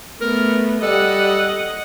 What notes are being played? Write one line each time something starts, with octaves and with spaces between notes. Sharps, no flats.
A3 B3 A#4
G3 A4 D#5 F#5